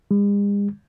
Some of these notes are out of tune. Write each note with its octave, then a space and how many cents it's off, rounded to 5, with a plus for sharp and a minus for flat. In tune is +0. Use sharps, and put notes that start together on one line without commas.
G#3 -45